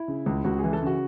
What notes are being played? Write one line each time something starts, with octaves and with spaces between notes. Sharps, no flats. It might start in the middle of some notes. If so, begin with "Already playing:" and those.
Already playing: E4
C#3
C#2
C#2 F#4
G#4
E3
A4
C#3 F#4